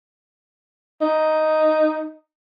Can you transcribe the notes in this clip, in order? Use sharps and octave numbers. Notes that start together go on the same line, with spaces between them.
D#4